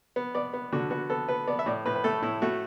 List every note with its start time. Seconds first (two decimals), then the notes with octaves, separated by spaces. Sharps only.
0.16 B3
0.35 B3 D5
0.53 B3
0.73 D3 F#4
0.91 B3 F#4
1.10 B3 A4
1.29 B3 B4
1.48 B3 D5
1.59 E5
1.66 A2 D5
1.86 A2 B4
1.96 B4
2.04 A3 A4
2.22 A2 E4
2.42 A3 F#4